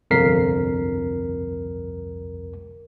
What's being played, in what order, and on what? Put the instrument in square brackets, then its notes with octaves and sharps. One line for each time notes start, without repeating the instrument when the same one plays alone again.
[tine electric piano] G1 C2 F2 A#4 B6 C7